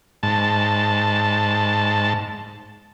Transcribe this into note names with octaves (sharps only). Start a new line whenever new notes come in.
G#2 A5